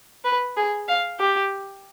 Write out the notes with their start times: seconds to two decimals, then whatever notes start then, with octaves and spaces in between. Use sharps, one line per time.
0.25 B4
0.56 G#4
0.88 F5
1.19 G4